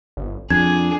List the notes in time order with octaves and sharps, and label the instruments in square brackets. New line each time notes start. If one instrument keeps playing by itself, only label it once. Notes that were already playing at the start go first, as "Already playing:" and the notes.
[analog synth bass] G1
[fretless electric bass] F2 [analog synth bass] D4 [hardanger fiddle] G#4 [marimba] G#6